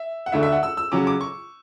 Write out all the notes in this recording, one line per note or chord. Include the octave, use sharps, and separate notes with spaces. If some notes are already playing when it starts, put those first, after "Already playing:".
Already playing: E5
F#5
D2 D3 A3 E5
E5
F#5
E6
E6
C#3 F#3 C#4 D6
D6
C#6